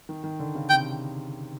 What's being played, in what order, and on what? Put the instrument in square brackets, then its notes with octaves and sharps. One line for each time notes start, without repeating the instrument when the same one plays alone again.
[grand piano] D#3
D#3
D3
C#3
[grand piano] C3 [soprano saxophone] G5